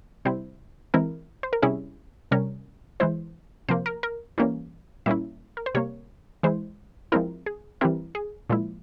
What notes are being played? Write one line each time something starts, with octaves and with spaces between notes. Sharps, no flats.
C3 G3 C4 E4 C5
E3 G#3 C4 E4 A#4
C5
A#4
C3 G3 C#4 E4 G#4
C3 G3 C#4 A#4
E3 G#3 E4 C5
C3 F3 A#3 C5
A#4
A#4
E3 G3 A#3 C#4
A#2 G3 A#3 C#4 E4 E5
A#4
C5
C3 G3 A#3 C#5
E3 G#3 E4 C5
F3 G#3 C4 E4 A#4
G#4
E3 G3 C4 E4 A#4
G#4
A#2 F3 G#3 E4